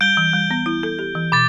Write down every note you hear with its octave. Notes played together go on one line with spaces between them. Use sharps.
G3 G6 D7 G7
E3
G3
B3
E4
A4
G4
E3
B2 D6 A6